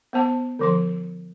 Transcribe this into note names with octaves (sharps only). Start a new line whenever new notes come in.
B3 C5 A5
D3 F3 C6